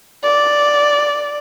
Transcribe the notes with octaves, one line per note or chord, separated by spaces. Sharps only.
D5